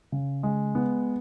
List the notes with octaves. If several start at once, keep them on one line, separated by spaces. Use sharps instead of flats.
C#3
G#3
B3